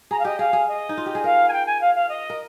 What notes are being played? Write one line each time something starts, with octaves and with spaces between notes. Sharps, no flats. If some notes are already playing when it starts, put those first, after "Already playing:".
G#4 A#5
F5
G4 D#5
G#4 F5
G#4
D#5
D#4
F4
G4
G#4
A#4 F5
G#5
G5
G#5
F5
F5
D#5
A#4